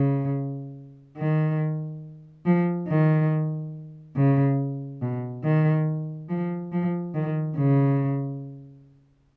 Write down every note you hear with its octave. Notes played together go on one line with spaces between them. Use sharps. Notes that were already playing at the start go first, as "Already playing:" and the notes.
Already playing: C#3
D#3
F3
D#3
C#3
B2
D#3
F3
F3
D#3
C#3